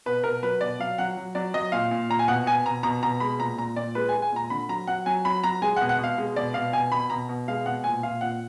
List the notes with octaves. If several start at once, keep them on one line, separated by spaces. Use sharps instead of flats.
B2 B4
B2 A#4
F#3 B4
B2 D5
F#3 F5
F#3 F#5
F#3
F#3 D5
F#3 D#5
A#2 F5
A#2
A#2 A#5
G#5
B2 F#5
B2 G#5
B2 A#5
B2 A#5
B2 A#5
G#3 B5
A#2 A#5
A#2 A#5
A#2 D5
G#3 B4
G#5
G#3
G#5
A#2 A#5
D3 B5
F#3 A#5
F#3 F#5
F#3 G#5
F#3 B5
F#3 A#5
G#3 G#5
F#5
B2
F#5
B2
F5
G#3
B2 D5
B2 F5
B2 G#5
B2 B5
B2 A#5
B2
G#3 F5
B2 F#5
A#2 G#5
A#2 F5
A#2 F#5